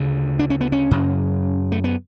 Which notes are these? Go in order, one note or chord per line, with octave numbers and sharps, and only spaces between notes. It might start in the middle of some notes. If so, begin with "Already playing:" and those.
Already playing: D2 C#3
D4
C#4
B3
C#4
F#2 C#3
A3
B3